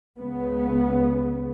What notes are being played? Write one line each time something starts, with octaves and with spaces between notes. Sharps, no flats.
C#2 C#3 B3